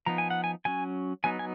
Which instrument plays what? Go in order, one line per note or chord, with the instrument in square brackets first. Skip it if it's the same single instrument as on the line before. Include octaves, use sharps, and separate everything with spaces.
[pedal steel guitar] F3 B3 D#4 A#5
G#5
F#5
G#5
F#3 C#4 G#5
F#3 B3 D#4 G#5
G#5